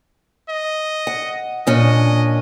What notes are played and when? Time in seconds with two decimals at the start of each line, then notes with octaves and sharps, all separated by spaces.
0.49 D#5
1.07 F#5
1.67 A#2 C#4 D4 D#5